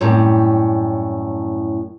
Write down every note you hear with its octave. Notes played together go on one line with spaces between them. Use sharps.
F#2 A2 G3 C4